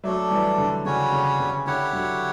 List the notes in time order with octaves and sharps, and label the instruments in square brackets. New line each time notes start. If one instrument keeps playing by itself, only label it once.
[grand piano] F#3 A3 [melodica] D4 A4 D5
[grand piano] E3 G3
D3
[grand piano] C#3 [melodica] G3 C#4 F#4 C#5
[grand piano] C#3
C#3
[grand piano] D3 [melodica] E4 G4 C#5 F#5
[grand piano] D3 F#3